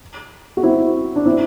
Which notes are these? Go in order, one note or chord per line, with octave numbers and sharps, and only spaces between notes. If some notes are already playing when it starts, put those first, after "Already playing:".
F#4
C4 E4
D4
C4 E4